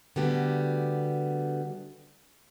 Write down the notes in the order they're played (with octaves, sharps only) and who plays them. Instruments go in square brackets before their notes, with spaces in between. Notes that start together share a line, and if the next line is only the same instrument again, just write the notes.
[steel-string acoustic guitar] D3 G3 A3 B3 F#4 G4